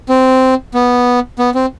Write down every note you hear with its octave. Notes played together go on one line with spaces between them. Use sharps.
C4
B3
B3
C4